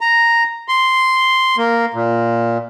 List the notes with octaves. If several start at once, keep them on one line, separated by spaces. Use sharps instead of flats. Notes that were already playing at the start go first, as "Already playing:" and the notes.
A#5
C6
A#3
A#2